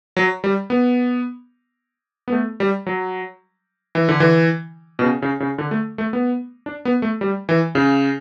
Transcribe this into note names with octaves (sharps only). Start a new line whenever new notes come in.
F#3
G3
B3
B3
A3
G3
F#3
E3
D3
E3
B2
C#3
C#3
C#3
D3
A3
A3
B3
D4
B3
A3
G3
E3
C#3